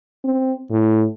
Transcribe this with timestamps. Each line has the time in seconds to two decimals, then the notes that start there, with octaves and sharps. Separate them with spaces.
0.24 C4
0.70 A2